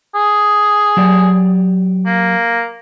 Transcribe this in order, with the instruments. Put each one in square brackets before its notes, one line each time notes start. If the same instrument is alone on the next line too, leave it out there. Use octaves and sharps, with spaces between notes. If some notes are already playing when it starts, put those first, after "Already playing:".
[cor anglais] G#4
[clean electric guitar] F#3 G4 D5
[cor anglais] A#3